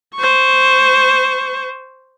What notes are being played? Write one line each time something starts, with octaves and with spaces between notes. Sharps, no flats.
C5 C#6